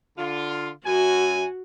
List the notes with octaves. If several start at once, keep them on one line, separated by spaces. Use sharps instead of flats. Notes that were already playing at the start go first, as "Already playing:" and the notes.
D3 F4
F#2 F#4 G#5